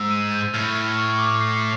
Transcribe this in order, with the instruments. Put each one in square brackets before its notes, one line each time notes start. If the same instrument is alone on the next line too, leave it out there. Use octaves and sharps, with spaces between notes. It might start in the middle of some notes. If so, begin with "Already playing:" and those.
Already playing: [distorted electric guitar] G#2 [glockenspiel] E6
[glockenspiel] D#7
G6
[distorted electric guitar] A2 [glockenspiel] F6
[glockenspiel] F6
C#6
D6
C7